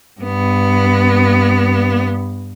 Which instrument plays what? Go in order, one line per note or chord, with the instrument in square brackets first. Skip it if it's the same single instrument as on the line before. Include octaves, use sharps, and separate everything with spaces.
[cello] G2 B3